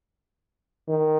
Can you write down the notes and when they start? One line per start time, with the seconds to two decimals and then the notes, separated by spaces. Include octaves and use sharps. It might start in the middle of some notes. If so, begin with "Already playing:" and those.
0.89 D#3